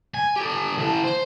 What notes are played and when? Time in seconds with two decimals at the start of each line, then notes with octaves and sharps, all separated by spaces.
0.14 G#5
0.36 G4 A4
0.78 E3 A5
1.04 C5